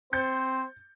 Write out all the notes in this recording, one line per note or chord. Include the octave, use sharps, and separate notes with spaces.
C4 C5 G6 A6 C#7